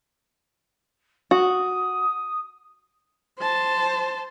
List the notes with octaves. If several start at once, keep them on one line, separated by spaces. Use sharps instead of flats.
F#4 D#6
C5 A5